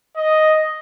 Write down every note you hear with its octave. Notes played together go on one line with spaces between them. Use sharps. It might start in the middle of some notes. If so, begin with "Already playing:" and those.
D#5